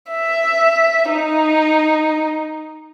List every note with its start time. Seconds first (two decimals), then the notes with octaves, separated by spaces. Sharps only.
0.11 E5
1.10 D#4